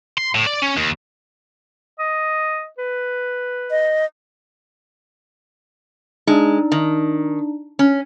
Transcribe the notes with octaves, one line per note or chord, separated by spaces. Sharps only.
C6
A2
D5
C#4
D#2
D#5
B4
D#5
G#3 D4 D#4
D#3
C#4